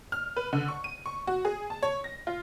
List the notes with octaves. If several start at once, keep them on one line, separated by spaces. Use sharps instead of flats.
F6
B4
D3
C#6
D#7
C#6
F#4
G#4
A5
C#5
A#6
F4